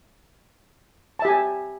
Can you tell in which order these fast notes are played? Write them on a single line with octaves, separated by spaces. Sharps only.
A5 E5 G4 G#5